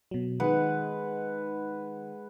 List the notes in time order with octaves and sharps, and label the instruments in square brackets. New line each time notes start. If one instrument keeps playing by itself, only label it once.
[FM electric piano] B2 F#3
[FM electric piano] D#3 D#4 [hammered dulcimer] G#3 B4 F#5